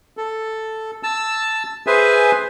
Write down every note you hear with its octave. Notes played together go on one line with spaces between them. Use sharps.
A4
A5 E6
G#4 B4 C5 E5 G#5